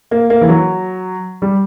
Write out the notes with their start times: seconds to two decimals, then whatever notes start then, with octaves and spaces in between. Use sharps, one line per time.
0.11 A#3
0.30 A#3
0.41 E3
0.49 F#3
1.42 G3